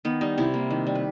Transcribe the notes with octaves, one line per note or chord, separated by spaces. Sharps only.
D#3 B3
G3 D#4
C3 E4
A#3
D#3
G3
B4